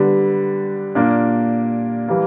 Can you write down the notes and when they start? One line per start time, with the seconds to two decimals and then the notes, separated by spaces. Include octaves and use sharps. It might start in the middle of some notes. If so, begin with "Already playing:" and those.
Already playing: D3 G3 B3
0.95 A#2 A#3 D4
2.08 E3 G3 A#3